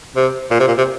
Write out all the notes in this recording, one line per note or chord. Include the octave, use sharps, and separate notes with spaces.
C3
A#2
C3
A#2
C3